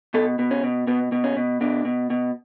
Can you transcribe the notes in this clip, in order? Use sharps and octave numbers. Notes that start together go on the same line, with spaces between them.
B2 A4
B2
C#4
B2
B2 B3
B2
C#4
B2
B2 D4
B2
B2